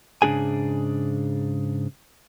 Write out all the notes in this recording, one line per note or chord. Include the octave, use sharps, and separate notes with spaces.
G#2 C#3 C4 D4 G#4 G#5